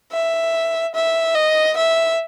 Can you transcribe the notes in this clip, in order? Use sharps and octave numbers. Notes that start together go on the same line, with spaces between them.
E5
E5
D#5
E5